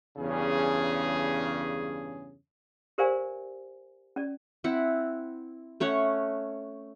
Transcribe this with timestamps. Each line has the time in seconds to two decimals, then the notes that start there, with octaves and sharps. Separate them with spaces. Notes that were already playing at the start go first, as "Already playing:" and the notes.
0.17 E2 G2 C#3 C#4 G#4
2.98 G4 A#4 C5 D5 F5 G#5
4.16 C#4 D5
4.64 C4 E4 F#5
5.80 A3 C#4 C#5 F#5